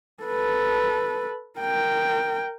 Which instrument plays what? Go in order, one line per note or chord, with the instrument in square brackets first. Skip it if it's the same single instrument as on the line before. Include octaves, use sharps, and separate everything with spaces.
[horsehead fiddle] A4 B4
A#4 G5